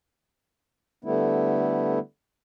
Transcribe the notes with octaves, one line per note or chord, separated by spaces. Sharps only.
D3 G3 A3 B3 E4